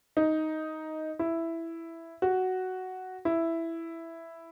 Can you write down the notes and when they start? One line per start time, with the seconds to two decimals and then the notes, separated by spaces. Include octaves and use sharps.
0.17 D#4
1.19 E4
2.22 F#4
3.25 E4